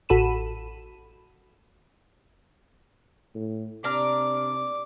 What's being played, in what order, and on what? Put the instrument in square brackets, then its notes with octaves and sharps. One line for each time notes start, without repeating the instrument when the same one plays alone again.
[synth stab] A1 F#4 A4 B5 D#7 E7
[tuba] A2
[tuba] C3 [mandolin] D4 A#5 F6 [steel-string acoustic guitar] D5 [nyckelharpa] D6